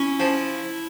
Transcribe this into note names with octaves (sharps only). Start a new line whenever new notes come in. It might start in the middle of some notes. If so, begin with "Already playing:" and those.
Already playing: C#4 E4
F3